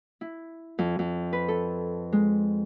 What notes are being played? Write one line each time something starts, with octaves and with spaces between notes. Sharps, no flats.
E4
F2
F2
B4
A4
G#3